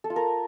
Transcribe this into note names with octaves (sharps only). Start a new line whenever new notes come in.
A4
F4
A#4